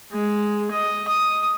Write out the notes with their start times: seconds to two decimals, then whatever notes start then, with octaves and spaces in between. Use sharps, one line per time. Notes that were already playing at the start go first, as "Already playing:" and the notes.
0.11 G#3
0.71 D#5
1.08 D#6